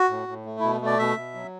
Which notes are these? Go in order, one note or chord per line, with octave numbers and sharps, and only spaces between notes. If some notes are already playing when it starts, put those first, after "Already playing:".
Already playing: F#4
A2
A2
A3
B2 E4
A3
D5
B2 E5
B2
F#3